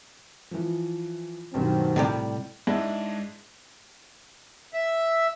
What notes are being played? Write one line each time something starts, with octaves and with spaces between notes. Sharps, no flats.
E3 F3
B1 G2 D#3 F#3 C4
A2 C3 G3
G#2 G#3 D4 E4
E5